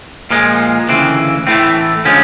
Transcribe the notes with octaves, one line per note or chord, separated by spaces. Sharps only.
A#2 F3 G#3
D2 C#3 E3 C4
A2 E3 A3 C4
D3 F3 G#3 C#4